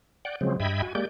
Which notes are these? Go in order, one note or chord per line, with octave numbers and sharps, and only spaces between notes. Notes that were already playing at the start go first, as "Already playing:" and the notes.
D5 F#5 G5
C#3 F3 F#3 G#3 C4
G2 D#5 E5 G5 B5 G#6
F#4 G#5
G#3 A#3 G4 D5 G6